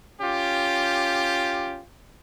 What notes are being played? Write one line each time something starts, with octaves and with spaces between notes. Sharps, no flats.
C#4 F4 G4